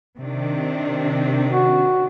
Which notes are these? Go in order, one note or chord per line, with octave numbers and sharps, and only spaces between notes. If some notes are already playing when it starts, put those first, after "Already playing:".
C3 D#3 D4
F#4